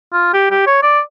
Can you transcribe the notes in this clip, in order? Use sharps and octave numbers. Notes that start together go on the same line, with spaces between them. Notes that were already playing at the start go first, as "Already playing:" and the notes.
F4
G4
G4
C#5
D5